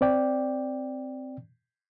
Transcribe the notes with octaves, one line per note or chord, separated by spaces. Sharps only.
C4 D5 G5